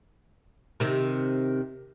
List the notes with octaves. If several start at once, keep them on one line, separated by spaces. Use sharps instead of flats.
C3 D#3